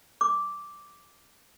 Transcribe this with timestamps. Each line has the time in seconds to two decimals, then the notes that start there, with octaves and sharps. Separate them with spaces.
0.21 D6